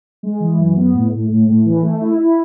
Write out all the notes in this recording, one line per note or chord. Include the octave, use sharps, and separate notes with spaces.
G#3
E3
F#2
B3
A2
A2
A2
A2
E3
A3
E4
E4